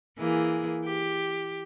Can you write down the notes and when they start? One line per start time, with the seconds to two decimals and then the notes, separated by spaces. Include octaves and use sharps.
0.18 E3 A#3 G#4
0.85 G4